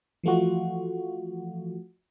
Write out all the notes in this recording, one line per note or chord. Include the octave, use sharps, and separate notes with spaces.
E3 F3 A3 F4 F#4